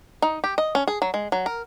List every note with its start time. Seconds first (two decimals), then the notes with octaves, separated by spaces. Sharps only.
0.22 D#4
0.44 G4
0.58 D#5
0.75 C#4
0.88 G#4
1.02 F#3
1.14 G#3
1.32 F#3
1.46 A#4